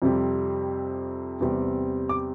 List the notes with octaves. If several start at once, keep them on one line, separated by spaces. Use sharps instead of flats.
F2 C3 G3 C4
E2 C3 G3 C4
D6